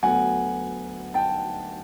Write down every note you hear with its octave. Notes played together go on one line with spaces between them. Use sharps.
D2 D3 F#3 B3 F#5 G#5
G5 A5